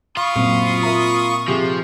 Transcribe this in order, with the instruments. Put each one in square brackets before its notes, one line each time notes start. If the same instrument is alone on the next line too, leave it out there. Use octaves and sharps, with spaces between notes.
[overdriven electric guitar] F4 [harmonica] B5 C#6 D#6
[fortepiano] F#2 [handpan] A#2 C4
[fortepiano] A#4 E5 A#5
[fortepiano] C3 G4 G#4 [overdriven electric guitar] F3